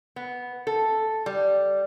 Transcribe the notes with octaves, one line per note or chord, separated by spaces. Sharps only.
B3
A4
G3